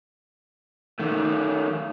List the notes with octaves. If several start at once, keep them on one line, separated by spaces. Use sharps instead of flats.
D#3 A3